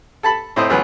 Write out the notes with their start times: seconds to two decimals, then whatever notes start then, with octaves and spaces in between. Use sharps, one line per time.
0.23 A4 A5 B5
0.56 A2 C4 C5 D#5
0.70 C#2 E3 F#3 B3